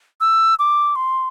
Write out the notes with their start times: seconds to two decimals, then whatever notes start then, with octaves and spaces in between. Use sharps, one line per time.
0.21 E6
0.59 D6
0.96 C6